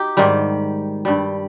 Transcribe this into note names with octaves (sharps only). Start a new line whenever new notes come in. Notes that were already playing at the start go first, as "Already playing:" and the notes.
Already playing: D#4 G4
G#2 D#3 G3
G2 G3